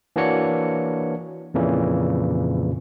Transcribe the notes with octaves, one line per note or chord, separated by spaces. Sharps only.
E3 A#3 D4 F#4 C#5 C#7
F2 A#2 C#3 E3